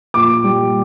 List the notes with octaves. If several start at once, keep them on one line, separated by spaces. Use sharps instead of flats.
A#2 D6
G3